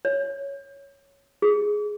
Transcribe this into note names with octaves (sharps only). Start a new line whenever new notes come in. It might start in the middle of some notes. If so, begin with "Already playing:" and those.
C#5
G#4